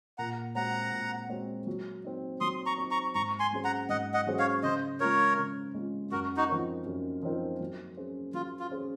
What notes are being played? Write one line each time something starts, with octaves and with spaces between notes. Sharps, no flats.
A#2 F#5 A#5
G#3 C4 F#4 C#5 F#5 A#5
A#2
G#3 C4 F#4 C#5
F#3
C4 D#4
F#3 C6 D#6
A#5 C#6
C4 D#4
A#5 C#6
G#2 A#5 C#6
G#5 C6
F#3 C#4 G#4 C5
F#5 A#5
G#2 D#5 F#5
D#5 F#5
F#3 C#4 G#4 C5
C#5 F5
C#3 C5 D#5
G#3 C#4 F4 A#4 C#5
C#3
G#3 C#4 F4
F#2 F#4 A#4
D#4 F#4
F3 C4 D#4 A#4
F#2
F3 C4 D#4 A#4
F#3
C#4 G#4 C5
F#3 F4
F4
C#4 G#4 C5